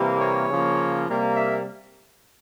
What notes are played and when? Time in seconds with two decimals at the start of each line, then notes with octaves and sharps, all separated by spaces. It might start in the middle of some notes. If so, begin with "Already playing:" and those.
Already playing: C3 E3 G3 A#3
0.20 C#5
0.49 C#3 F3 A#3
1.07 C3 G3 A#3
1.36 E5